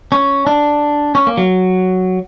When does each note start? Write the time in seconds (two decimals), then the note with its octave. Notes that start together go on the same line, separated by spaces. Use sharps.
0.12 C#4
0.47 D4
1.15 C#4
1.27 A#3
1.37 F#3